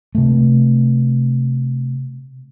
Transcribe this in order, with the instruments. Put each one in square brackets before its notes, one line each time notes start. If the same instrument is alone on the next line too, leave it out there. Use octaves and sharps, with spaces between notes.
[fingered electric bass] C3 A3